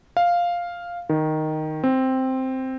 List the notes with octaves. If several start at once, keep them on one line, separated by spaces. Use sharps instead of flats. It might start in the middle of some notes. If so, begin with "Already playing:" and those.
F5
D#3
C4